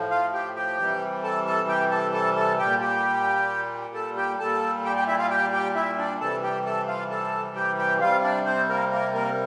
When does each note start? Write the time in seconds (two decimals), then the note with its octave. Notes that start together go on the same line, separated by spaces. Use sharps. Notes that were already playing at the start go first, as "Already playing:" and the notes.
Already playing: A2 F3
0.10 F4 F5
0.33 G4 G5
0.56 G4 G5
0.78 C3 E3 G3
1.24 A4 A5
1.46 A4 A5
1.68 G4 G5
1.91 A4 A5
2.14 A4 A5
2.36 A4 A5
2.59 A#2 G3 G4 G5
2.81 G4 G5
3.94 A4 A5
4.17 G4 G5
4.39 A#2 G3 A4 A5
4.85 G4 G5
4.96 G4 G5
5.08 E4 E5
5.18 F4 F5
5.30 G4 G5
5.52 G4 G5
5.75 E4 E5
5.98 D4 D5
6.20 C3 E3 G3 A4 A5
6.43 G4 G5
6.66 A4 A5
6.88 F4 F5
7.10 A4 A5
7.56 G4 G5
7.78 G4 G5
8.01 C3 G3 F4 F5
8.23 D4 D5
8.46 C4 C5
8.69 A#3 A#4
8.91 A#3 A#4
9.14 A#3 A#4